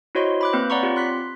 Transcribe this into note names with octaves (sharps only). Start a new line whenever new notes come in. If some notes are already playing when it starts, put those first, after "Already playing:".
E4 F#4 C5 C#5 D#5 C6
B5 D6 F#6
A#3 C4 B4 G6
C#5 D5 F#5 A#5 B5 C#6
C4 F4 G4
C6 F#6 B6